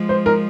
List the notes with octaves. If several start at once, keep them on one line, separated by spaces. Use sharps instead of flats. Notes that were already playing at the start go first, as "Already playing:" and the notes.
Already playing: F3 G#3
C5
A#4